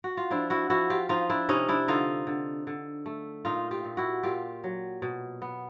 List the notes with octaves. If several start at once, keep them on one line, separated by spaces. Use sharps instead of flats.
F#4
F4
F3 D4 E4
E4 F#4
F3 E4 F#4
F4 G4
F3 D#4 F4
D4 E4
C3 C#4 D#4
D4 E4
D3 D#4 F4
D3
D3
A3
A#2 D#4 F4
F4 G4
A#2
E4 F#4
A#2 F4 G4
F#3
B2
B3